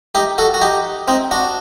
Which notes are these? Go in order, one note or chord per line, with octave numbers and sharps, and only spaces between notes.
D#4 G4
F#4 A4
F#4
D#4 G4
C4 D#4
D4 F#4